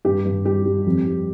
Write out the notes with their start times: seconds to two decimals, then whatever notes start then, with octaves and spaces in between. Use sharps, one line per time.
0.05 G2 G4
0.25 G2
0.45 G3 G4
0.66 G3
0.86 F2
1.06 G3